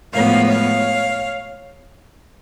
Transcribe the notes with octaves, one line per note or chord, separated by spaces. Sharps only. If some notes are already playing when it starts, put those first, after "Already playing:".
A2 F3 G#3 B3 C#5 F5
C#5 F5